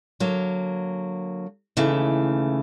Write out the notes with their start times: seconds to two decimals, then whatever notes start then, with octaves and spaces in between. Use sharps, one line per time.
0.20 D3 F#3 A#3
1.77 D#2 C#3 E3 A3